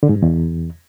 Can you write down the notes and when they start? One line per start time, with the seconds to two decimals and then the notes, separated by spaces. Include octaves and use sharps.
0.03 D3
0.09 G#2
0.16 G2
0.22 E2